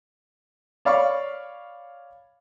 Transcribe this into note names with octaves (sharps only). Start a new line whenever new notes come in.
C#5 D5 F5 B5 C#6